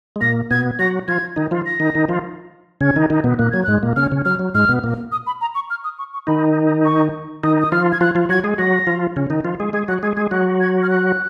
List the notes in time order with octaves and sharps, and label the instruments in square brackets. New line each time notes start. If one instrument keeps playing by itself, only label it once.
[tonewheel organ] G#3
[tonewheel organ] A#2 A#3 [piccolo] A#6
[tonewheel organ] B2 B3 [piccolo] G#6
[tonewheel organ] F#3 F#4 [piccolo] A#6
[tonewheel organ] F3 F4 [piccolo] G#6
[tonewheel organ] D#3 D#4
F3 F4
[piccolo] A#6
[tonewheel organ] D#3 D#4
D#3 D#4
F3 F4
[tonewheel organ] C#3 C#4 [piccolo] G#6
[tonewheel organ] D#3 D#4
D#3 D#4
B2 B3
[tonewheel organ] A#2 A#3 [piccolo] F#6
[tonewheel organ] F#3 [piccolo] G#6
[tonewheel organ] G#2 G#3 [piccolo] F#6
[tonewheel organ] A#2 A#3
[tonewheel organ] C#3 C#4 [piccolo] F6
[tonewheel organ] C#3 C#4
[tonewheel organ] F#3 [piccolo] F6
[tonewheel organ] F#3
[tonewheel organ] G#2 G#3 [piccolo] F6
[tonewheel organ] B2 B3
A#2 A#3
[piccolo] D#6
B5
A#5
C#6
F6
D#6
C#6
C#6
[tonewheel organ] D#3 D#4 [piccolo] B5
[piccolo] C#6
[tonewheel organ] D#3 D#4 [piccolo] D#6
[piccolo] D#6
[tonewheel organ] F3 F4 [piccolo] F6
[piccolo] G#6
[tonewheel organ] F3 F4 [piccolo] F#6
[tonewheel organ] F3 F4
[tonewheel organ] F#3 F#4 [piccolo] G#6
[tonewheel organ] G#3 G#4
[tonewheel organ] F#3 F#4 [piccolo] A#6
[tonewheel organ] F3 F4
C#3 C#4
D#3 D#4
F3 F4
G#3 G#4
[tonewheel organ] G#3 G#4 [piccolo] G#6
[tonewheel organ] F#3 F#4 [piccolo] F#6
[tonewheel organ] G#3 G#4 [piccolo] G#6
[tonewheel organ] G#3 G#4 [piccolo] G#6
[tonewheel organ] F#3 F#4 [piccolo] F#6
[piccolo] G#6
F6
F#6